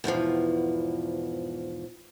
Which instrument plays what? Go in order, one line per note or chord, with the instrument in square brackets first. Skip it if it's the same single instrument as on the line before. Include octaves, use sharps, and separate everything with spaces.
[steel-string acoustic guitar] E2 G#2 B2 F3